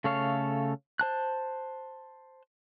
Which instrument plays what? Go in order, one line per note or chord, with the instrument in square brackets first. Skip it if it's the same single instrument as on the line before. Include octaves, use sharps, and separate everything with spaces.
[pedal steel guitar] C#3 A3 A4 C#5 F5
C5 A5 F#6